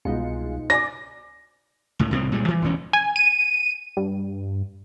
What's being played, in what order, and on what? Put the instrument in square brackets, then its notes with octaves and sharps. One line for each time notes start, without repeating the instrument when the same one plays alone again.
[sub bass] C2 [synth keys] B2 D#4 C#7 [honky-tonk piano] G#3 F4
[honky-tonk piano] D5 G#5 D6 [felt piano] A#6
[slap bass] C#2 A2
C2 A2 G#3 C4
A#2 G3 G#3
E3 F3
E1 D2 E3 C#4
[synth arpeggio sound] G#5
D#7
G2